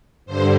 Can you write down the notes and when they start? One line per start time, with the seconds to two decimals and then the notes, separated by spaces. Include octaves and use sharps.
0.26 G2 D3 C5